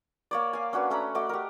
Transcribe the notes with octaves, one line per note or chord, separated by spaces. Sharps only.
A#3 C#5 D5
F5 G#5
C#4 D4 F#4 B4
A3 C#4 A#5 B5
A3 F#4 D5 D#5
G4 A#4